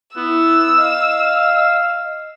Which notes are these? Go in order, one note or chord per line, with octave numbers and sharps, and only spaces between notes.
B3 E4 E6
D#5 F5